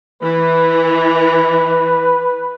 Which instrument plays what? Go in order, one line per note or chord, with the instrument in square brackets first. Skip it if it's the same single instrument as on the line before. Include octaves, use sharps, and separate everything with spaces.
[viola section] E3 [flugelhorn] B4